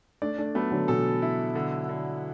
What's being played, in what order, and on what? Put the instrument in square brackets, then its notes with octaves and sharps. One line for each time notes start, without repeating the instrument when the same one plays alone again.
[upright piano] A3 D4 [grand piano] D5
[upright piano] A3 D4
[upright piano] F#3 B3 [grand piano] A3
[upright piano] D3 F#3
[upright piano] B2 E3 [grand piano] A4
[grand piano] E4
D3
D3